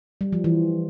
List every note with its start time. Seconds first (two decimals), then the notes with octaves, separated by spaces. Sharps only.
0.21 G3
0.32 F3
0.44 E3